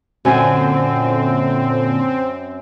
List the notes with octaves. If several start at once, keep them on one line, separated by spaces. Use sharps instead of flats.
F#2 A#2 D3 C4 G#5